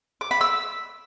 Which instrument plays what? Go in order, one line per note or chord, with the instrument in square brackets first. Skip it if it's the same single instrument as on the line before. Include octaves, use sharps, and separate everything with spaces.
[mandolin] D6
B5
E6